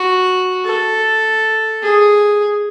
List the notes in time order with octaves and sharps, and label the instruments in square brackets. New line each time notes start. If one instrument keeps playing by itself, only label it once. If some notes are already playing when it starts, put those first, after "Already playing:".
Already playing: [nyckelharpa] F#4
A4
G#4